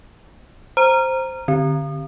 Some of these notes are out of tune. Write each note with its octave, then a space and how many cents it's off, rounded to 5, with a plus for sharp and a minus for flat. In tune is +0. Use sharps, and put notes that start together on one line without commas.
C5 +0 A#5 +0
D3 +15 C4 +10